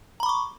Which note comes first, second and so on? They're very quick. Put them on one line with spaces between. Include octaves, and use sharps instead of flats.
A#5 B5 D6 C#6